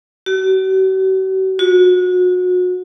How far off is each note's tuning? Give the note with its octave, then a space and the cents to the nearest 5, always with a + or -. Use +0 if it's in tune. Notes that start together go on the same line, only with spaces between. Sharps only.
F#4 +45
F#4 -30